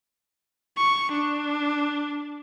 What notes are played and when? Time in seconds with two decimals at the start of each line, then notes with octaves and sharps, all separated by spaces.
0.77 C#6
1.12 D4